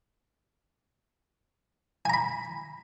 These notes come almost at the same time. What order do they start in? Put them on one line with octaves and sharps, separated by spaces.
G#5 A#5 B5